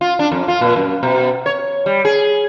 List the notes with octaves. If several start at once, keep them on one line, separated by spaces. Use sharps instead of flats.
F4
D4
F2
F4
A#2
F#2
B2
C#5
G3
G#4